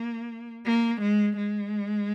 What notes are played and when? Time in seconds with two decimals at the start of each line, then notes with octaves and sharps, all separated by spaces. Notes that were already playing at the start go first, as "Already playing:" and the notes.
Already playing: A#3
0.65 A#3
1.01 G#3
1.37 G#3